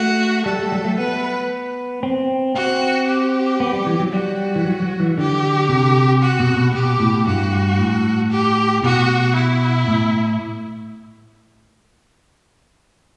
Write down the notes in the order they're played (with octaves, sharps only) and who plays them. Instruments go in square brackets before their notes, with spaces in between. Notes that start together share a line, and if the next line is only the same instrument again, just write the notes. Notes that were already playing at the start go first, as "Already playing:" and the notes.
Already playing: [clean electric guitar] A3 [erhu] F#4
[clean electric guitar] G3 [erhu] A4
[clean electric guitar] G3
F#3
A3
[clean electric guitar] B3 [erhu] B4
[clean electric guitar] C4
[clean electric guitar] C4 [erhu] F#4
[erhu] G4
[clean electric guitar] B3
G3
E3
F#3
[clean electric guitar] G3 [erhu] F#4
[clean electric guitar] E3
F#3
F#3
E3
[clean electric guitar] D3 [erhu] G4
[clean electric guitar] C3
[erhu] F#4
[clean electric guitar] B2
B2
[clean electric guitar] B2 [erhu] G4
[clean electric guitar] A2
[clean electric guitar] G2 [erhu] F#4
[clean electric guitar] A2
[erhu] G4
[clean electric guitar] B2 [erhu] F#4
[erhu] E4
[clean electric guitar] A2